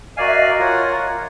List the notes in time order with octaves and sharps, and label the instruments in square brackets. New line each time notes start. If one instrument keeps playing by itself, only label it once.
[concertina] F#4 A#4 D5 F5 G#5 [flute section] D#5
[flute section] E5
D#5
[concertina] F4 A#4 C#5 F#5